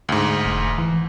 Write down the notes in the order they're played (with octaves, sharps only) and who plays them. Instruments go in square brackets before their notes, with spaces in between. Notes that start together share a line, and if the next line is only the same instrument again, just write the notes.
[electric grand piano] D2 G#2
[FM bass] E1
E3